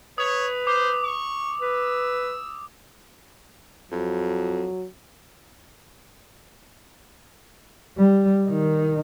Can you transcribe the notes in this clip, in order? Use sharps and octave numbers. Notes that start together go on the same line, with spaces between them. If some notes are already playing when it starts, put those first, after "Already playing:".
B4 C#5 D#6 F7
C5 D6
C#6
B4 E6
F2 F#3
G3
D#3 D#4